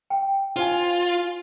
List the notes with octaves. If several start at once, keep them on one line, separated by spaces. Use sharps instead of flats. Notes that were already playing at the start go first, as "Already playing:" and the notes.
G5
F4 C5 D#5 G#5